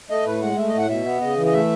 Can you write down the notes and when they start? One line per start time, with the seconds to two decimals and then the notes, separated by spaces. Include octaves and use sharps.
0.10 A3 D#5
0.25 A2 B4
0.42 G#3 F#5
0.57 A3 E5
0.68 D#5
0.74 A2 F#5
0.89 B2 E5
1.05 B3
1.21 C#3 D#5
1.37 E3
1.46 D#5
1.53 A3 E5